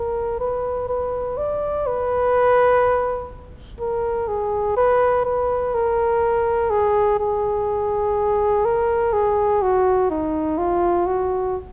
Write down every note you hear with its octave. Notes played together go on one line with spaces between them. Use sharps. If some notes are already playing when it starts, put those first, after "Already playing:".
Already playing: A#4
B4
B4
D5
B4
A#4
G#4
B4
B4
A#4
G#4
G#4
A#4
G#4
F#4
D#4
F4
F#4